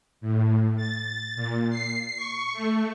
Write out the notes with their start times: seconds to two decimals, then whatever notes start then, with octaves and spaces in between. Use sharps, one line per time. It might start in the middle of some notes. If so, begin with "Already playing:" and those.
0.21 A2
0.77 A6
1.36 A#2
1.70 C7
2.17 C#6
2.53 A3